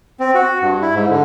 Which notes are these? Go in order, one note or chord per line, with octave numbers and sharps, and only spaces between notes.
C4
F#4
G2
E4
G#2
D3